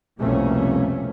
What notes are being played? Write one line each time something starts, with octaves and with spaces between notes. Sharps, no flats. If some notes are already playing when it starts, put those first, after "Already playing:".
C2 F2 B2 A3 A#3 C#4